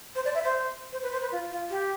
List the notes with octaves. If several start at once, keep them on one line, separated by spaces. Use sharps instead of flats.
C5
D5
E5
C5
C5
B4
C5
B4
F4
F4
G4